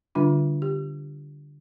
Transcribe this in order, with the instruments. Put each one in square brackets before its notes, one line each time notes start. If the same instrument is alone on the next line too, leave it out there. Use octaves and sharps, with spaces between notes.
[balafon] D3 G3 D4 F4
G4